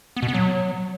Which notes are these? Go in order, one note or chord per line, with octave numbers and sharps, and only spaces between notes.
B3
B2
B3
F#3